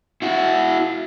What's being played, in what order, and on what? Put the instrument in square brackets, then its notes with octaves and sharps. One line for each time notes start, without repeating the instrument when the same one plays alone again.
[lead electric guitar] E4 F#4